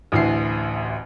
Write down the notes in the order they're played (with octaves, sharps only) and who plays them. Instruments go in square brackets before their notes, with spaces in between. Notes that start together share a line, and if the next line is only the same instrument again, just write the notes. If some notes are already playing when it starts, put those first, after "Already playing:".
[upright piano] A1 D2 E3 C7